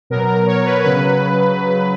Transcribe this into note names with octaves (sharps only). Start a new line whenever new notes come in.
B2 F#3 A#4
A#4
C#5
B4
C#3 F#3 B4